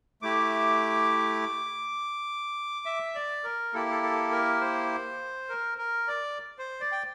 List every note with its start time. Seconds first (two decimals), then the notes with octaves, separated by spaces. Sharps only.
0.22 A3 E4 G4 D6
2.86 E5
3.15 D5
3.44 A#4
3.73 A#3 E4 G4 A4
3.91 A4
4.03 A4
4.32 A#4
4.61 C5
5.49 A#4
5.78 A#4
6.08 D5
6.59 C5
6.81 D5
6.92 G5